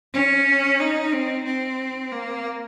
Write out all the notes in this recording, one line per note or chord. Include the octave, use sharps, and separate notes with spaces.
C#4
D#4
C4
C4
A#3